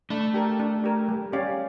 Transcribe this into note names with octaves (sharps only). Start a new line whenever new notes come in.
A3 D4
G4 A#4
D4
G4 A#4
G3
C#4 G4 D5 F5